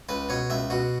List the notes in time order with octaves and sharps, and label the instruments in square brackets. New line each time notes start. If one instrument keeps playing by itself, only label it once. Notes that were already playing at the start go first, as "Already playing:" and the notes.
[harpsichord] C#2 B4
B2 C#5
C#2 E5
B2 F#4